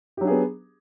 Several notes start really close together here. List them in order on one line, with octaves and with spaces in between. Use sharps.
G4 F#3 D4 G#4 B3